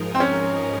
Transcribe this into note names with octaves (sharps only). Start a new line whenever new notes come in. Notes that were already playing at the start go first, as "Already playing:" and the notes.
Already playing: G#2 F3 G#3 D#4 A#4
C4
C#4